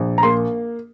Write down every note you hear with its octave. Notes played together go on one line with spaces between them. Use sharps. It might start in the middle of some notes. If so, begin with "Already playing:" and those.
Already playing: A#1
A#5
A#3 C6